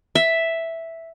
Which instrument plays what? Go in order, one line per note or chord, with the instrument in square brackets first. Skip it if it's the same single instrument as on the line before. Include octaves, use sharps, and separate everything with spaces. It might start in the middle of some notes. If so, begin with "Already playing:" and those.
[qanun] E5